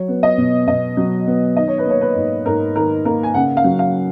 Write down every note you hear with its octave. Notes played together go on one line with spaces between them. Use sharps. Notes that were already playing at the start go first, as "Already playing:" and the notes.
Already playing: F#3 C#5
B3
D#5
B2
B2 D#5
F#3
B3
D#3 D#5
C#5
B4
A#3 C#5
B4
G#2
G#2 A#4
D#3 A#4
A#3 A#4
G#5
C#3 F#5
F5
F#3
F5